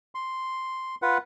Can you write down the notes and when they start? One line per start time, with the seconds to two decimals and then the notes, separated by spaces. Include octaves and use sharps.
0.15 C6
1.02 F4 B4 F#5